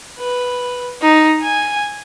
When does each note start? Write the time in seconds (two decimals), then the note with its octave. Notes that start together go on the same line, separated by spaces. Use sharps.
0.19 B4
1.02 D#4
1.43 G#5